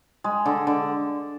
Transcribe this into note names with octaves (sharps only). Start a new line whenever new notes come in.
G#3
D3
D3